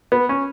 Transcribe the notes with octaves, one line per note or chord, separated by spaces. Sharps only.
B3
C#4